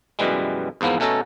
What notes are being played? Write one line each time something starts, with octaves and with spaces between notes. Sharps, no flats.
F#2 B2 E3 G3 G#3
E2 G#2 F3 A#3 B3
B2 A3 C#4 A4 A5 A#5